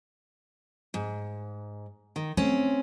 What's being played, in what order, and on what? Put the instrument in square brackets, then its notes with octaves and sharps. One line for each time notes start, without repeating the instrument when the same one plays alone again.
[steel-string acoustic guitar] G#2
D#3
[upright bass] A3 [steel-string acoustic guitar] C4 C#4